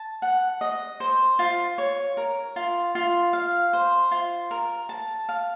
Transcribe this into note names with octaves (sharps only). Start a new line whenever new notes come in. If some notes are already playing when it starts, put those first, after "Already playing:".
Already playing: A5
F#5
D#5
C5
F4
C#5
A#4
F4
F4
F5
C5
F4
A#4
A5
F5